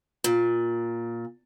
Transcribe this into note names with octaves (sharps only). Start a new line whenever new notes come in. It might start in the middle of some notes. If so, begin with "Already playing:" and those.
A#2